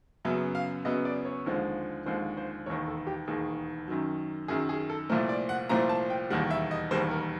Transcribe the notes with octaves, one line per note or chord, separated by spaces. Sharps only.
F#2 C#3 F#3 B3 E5
F5
F#2 C#3 F#3 B3 D#5
D5
C#5
D#2 D3 F3 G#3 C4
D#2 D3 F3 G#3 C4 C5
C5
E1 D#2 D#3 C#5
A4
G4
E1 D#2 D#3 G#4
F#2 D#3 F#3
F#2 D#3 F#3 G#4
G#4
A4
C2 A#2 F3 A3 C4 A#4
D5
F#5
C2 A#2 F3 A3 C4 A#5
A5
G5
E1 D#2 D#3 G3 F#5
E5
D#5
E1 D#2 D#3 G3 C5
A#4